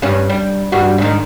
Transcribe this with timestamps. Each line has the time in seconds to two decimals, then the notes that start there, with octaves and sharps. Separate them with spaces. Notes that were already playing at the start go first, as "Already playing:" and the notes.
0.02 G2 C#4
0.30 G3
0.72 G2 G3 F#4
0.98 G#2 D#3